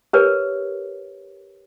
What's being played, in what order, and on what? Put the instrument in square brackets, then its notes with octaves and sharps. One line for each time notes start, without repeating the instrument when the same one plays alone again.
[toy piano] G4 A#4 B4 C#5